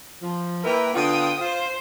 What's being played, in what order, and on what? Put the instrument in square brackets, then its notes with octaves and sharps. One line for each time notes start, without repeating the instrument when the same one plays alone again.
[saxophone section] F3
[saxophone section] A#3 E4 A#4 [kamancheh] B4 G5
[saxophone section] D3 B3 F4 [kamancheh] G5 D#6
[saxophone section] F4 [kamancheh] C5